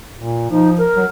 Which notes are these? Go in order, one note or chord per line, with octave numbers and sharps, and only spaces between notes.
A#2
F3 D#4
A#4
F#3